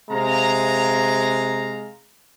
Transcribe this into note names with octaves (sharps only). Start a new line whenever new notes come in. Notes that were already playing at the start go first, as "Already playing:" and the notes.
C3 G#3 F5 A#5